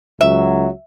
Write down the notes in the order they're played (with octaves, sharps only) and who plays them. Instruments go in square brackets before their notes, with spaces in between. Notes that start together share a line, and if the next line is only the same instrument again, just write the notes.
[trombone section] C#2 F#3 [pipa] E5